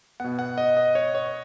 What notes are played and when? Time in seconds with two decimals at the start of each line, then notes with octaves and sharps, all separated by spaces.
0.20 B2 B3 F#5
0.39 F#5
0.58 D#5
0.77 D#5
0.95 C#5
1.15 C#5